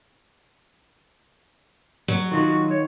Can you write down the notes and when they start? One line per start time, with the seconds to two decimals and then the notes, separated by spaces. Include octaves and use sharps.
2.08 F#3
2.32 D#3 D#4 F4 F#4
2.70 C#5